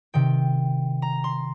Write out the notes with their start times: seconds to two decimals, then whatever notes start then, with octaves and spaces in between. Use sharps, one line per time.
0.14 C3 D#3 G5
1.02 A#5
1.24 C6